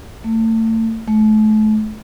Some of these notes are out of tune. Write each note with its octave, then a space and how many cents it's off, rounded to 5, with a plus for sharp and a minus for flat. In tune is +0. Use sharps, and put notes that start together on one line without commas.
A3 +35
A3 -35